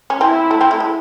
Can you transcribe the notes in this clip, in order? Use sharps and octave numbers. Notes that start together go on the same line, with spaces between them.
C#4
C4 E4
A3
C4
A3
G#3